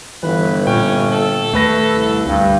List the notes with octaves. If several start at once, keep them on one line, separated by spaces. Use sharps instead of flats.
G1 E3 B4
A#2 C#4 G5
A4
D#2 A3 B4 A#6
C2
D2 G2